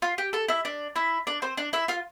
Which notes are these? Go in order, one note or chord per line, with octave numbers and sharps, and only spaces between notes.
F4 F5
G4 G5
A4 A5
E4 E5
D4 D5
E4 E5
D4 D5
C4 C5
D4 D5
E4 E5
F4 F5